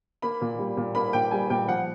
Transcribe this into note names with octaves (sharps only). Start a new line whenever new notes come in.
A#3 B5
A#2
G3
A#2
A#3 B5
A#2 G5
G3 G#5
A#2 G5
F3 F#5